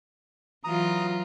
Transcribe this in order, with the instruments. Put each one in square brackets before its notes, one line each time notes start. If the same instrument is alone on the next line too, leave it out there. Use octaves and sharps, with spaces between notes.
[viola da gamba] E3 F#3 F4 [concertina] A#5 D#6